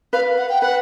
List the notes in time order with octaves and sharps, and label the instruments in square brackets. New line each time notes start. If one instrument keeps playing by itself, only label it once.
[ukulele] B4 [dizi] F5
[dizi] F#5
G5
[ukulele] B4 [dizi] F#5